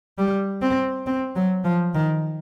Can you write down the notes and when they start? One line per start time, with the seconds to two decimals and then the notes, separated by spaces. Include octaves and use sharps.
0.18 G3
0.62 C4
1.07 C4
1.36 F#3
1.64 F3
1.94 D#3